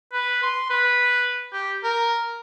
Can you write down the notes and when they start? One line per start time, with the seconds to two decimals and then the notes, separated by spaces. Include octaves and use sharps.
0.13 B4
0.43 C6
0.70 B4
1.53 G4
1.84 A#4